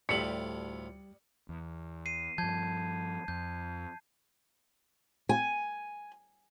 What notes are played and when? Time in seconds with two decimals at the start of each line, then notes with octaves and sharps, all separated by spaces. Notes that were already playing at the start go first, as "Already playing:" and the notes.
0.09 D2 A2 G3 F4 G4 D5 C#7 F#7
1.49 E2
2.06 C7 D#7
2.38 G2 F3 A5 G6 G#6
3.28 F2 G6
5.29 G#5